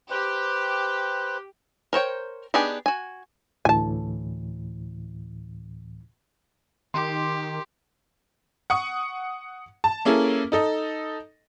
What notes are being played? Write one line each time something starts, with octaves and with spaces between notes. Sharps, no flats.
G4 B4 C5
A#4 C5 C#5 G5
B3 D4 D#4 G4 G#4
F#4 G#5
D2 A2 E3 G#5 A5
D#3 G4 C6 D6
F#5 C#6 D#6
A5
A#3 C#4 E4 G#4 A4
D#4 A4 D#5